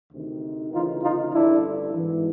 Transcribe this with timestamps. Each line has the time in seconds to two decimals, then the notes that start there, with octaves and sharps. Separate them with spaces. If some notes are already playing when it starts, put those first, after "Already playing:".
0.12 D2 C3 D#3
0.72 D2 C#3 E3 D#4 F4
1.02 D#4 F4
1.32 A1 G2 D3 D4 E4
1.94 G#1 G#2 E3